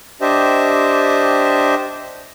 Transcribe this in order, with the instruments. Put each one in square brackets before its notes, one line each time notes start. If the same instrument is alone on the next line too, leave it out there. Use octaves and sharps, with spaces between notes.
[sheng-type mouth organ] D4 G4 C5 D#5 E5